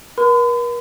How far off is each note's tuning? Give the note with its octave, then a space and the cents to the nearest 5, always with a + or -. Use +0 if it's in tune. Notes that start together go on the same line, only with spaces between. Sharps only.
A#4 +45 B5 +45